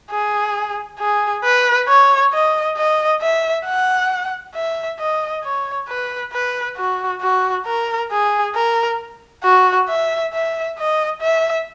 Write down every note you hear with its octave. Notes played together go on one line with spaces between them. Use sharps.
G#4
G#4
B4
C#5
D#5
D#5
E5
F#5
E5
D#5
C#5
B4
B4
F#4
F#4
A#4
G#4
A#4
F#4
E5
E5
D#5
E5